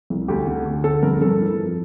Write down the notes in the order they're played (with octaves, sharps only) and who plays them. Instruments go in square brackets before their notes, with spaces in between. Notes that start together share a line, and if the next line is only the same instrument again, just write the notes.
[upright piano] C2
D2 G4
D3
D2
D3 A4
G2 A#4
A#4
G2 A4
E3
F2